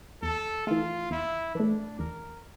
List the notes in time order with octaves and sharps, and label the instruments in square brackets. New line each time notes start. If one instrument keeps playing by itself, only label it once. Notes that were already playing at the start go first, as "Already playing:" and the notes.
[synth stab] E2 [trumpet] A4
[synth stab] E3 A3 [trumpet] F4
[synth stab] E2 [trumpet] E4
[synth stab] E3 A3 [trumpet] D4
[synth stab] E2 [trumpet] A#4